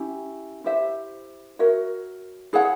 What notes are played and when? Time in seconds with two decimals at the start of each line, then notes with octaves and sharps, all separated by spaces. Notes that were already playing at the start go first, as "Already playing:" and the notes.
Already playing: C#4 E4 G4
0.64 E4 G4 C5 E5
1.59 F#4 A#4 C#5 E5
2.53 E4 G#4 C#5 F#5